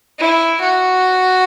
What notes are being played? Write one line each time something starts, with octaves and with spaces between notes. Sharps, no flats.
E4
F#4